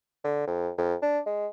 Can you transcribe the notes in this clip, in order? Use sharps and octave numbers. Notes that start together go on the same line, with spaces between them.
D3
F2
F2
D4
G#3